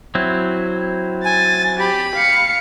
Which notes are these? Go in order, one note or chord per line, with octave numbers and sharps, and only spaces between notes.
F#3 C4 E4
G#5 A6
G4 B5
F5 C#7